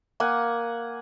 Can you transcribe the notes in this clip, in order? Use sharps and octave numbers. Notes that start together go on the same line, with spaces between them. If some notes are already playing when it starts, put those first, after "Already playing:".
A#3 F#5 G#5